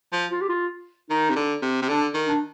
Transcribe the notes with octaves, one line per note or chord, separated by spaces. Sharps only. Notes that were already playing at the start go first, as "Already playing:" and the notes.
F3
F4
G4
F4
D#3 D#4
C3
D3
C3
C3
D3 D4
D#3
D4